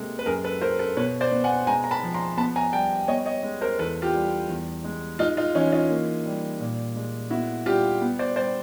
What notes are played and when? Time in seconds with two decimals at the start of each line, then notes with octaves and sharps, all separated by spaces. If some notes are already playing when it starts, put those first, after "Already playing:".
Already playing: C3 G#3 A#3 A4
0.19 B4
0.26 F#2 G#4 A#4
0.44 A4 B4
0.62 F#3 A#4 C5
0.79 A4 B4
0.97 B2 B4 C#5
1.21 C5 D5
1.32 B3
1.44 F#5 G#5
1.67 G#3 G#5 A#5
1.84 A#5
1.91 A5 B5
2.03 F3
2.14 A#5 C6
2.37 B3 A5 B5
2.56 G#5 A#5
2.73 G3 G5 A5
3.08 B3 C#5 D#5
3.26 C#5 D#5
3.43 G#3
3.61 A#4 C5
3.79 E2 A4 B4
4.02 F4 G4
4.14 G3
4.49 E2
4.84 G#3
5.19 G#3 D#4 F4
5.37 D#4 F4
5.55 E3 C#4 D#4
5.72 D#4 F4
5.90 A#3
6.25 G3
6.60 A#2
6.96 G#3
7.30 B3 E4 F#4
7.66 G3 F4 G4
8.02 B3
8.19 C5 D5
8.36 G3 C5 D5